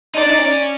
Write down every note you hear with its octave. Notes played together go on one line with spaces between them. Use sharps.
D#4 D5
D4
D#4
C#4